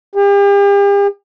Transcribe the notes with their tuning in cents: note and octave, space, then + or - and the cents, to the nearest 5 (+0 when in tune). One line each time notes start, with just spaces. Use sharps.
G4 +40